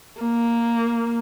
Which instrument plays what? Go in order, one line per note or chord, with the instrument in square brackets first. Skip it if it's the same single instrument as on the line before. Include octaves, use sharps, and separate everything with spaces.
[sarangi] A#3